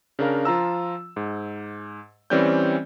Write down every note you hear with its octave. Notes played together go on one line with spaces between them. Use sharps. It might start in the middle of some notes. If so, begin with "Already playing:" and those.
C#3 D4 A#4 F5
F3 F4 A#5 E6
G#2
E3 G3 C4 C#4 D5 G6